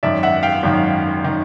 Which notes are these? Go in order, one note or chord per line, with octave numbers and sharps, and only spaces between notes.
G#1 F#2 D#3 D5 E5
E5 F#5
F5 G5
G#1 F#2 D#3
D#3